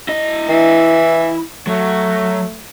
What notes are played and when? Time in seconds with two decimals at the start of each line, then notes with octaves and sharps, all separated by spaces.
0.09 E4 D#5
0.49 E3
1.67 F#3 A3